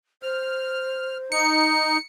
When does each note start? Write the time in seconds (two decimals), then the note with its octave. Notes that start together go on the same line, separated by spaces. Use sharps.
0.23 C5 F6
1.32 D#4 C#7